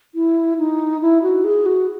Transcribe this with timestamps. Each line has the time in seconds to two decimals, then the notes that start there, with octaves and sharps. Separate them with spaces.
0.15 E4
0.58 D#4
1.02 E4
1.23 F#4
1.44 G#4
1.66 F#4